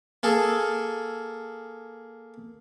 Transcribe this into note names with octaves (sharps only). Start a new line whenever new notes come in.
A#3 G#4 A4